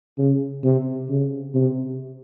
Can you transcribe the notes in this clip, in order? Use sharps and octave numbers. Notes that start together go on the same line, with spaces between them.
C#3
C3
C#3
C3